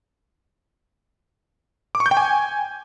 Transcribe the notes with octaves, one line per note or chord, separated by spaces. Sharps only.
D6
C#6
G6
G5
G#5